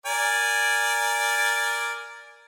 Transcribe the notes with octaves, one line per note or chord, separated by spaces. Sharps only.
A#4 D5 G#5